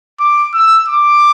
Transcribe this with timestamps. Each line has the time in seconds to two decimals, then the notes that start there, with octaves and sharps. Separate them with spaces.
0.20 D6
0.54 E6
0.88 D6